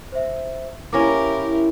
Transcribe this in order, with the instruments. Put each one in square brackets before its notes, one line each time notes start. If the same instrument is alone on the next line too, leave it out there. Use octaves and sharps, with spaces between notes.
[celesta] C5 E5
[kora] A#3 C#4 [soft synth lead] E4 [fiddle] G4 A#4 [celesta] D6 A#6